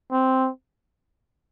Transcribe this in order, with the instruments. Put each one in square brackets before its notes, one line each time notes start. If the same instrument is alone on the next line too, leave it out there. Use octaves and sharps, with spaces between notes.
[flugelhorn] C4